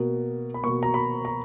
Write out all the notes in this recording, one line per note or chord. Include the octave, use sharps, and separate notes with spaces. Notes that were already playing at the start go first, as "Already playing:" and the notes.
Already playing: B2 A#3
B5
B2 A#3 C#6
A#5
B5
A#5